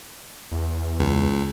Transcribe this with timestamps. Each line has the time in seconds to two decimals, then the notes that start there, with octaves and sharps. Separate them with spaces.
0.52 E2
0.99 C#2